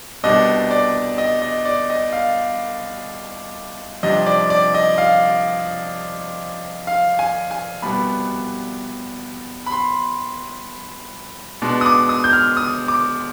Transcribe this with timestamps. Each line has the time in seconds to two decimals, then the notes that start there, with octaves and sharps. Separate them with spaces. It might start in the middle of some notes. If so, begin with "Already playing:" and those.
0.24 C2 B2 G3 D4 D#5
0.71 D5
1.18 D#5
1.42 D#5
1.65 D5
1.90 D#5
2.13 F5
4.03 F2 C3 G3 D4 D#5
4.26 D5
4.50 D5
4.74 D#5
4.98 F5
6.87 F5
7.19 G#5
7.51 G#5
7.82 C2 B2 G3 B3 B5
9.66 B5
9.72 C6
11.62 B2 G#3 D4
11.81 D#6
11.86 D6
12.09 D#6
12.24 G6
12.33 F6
12.57 D#6
12.88 D6